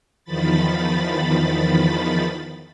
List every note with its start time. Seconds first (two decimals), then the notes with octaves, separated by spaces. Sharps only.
0.25 E2 D#3 F3 B5 A6